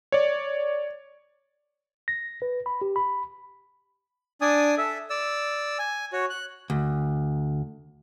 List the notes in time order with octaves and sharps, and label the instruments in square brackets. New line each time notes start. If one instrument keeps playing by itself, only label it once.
[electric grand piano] C#5 D5
[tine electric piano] A#6
B4
B5
G4
B5
[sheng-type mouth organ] D4 D5 G#5 D#6
A4 E5
D5 E6
G#5
F#4 C#5
F#6
[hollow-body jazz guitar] D2